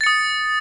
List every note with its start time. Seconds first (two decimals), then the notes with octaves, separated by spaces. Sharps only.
0.01 A6
0.04 C#7
0.06 D#6